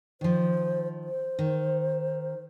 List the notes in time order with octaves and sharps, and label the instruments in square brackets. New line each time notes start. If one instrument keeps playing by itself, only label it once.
[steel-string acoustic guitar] D#3 F3 [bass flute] C5
[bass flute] C5
[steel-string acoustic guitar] D#3